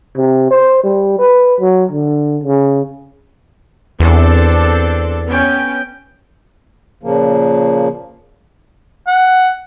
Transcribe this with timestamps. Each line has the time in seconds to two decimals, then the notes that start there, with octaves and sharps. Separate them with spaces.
0.17 C3
0.51 C5
0.83 G3
1.19 B4
1.60 F#3
1.91 D3
2.44 C#3
4.00 E2 C4 D4 A4
5.27 B3 C#4 G5
7.03 A#2 C#3 F3 A#3
9.07 F#5